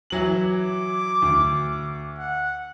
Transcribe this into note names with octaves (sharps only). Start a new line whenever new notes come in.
E3 F#3 F#7
D6
D2
F#5